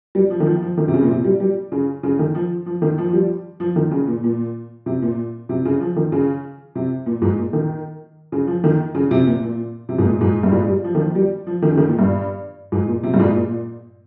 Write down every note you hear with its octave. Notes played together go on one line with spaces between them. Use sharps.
G3
F3
D#3
F3
F3
D#3
C3
C#3
A#2
C3
G3
G3
C#3
C#3
D#3
F3
F3
D#3
F3
F3
G3
F3
D#3
C#3
A#2
A#2
C3
A#2
C3
C#3
F3
D#3
C#3
C3
A#2
G#2
A#2
D#3
C#3
F3
D#3
C#3
C3
A#2
A#2
C3
G#2
A#2
G#2
G2
G#2
G3
F3
D#3
F3
G3
F3
D#3
C#3
D#3
A#2
G2
G#2
A#2
C3
G2
G#2
A#2